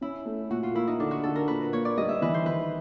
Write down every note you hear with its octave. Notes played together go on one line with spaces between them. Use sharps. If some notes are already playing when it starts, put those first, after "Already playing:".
C#4 E4
A3
A#2 F#4
F4
A#3 E4
D#4
D3 D4
F#4
D3 A4
A#4
A#2 B4
A#3 C#5
D5
G3 D#5
E5
E3 B4
C5
D#3 B4